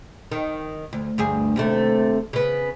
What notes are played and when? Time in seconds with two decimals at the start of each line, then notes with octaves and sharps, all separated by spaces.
0.31 D#3
0.93 D2
1.18 D2 G2 G#4
1.56 D#2 C3 A3
2.33 C#3 B3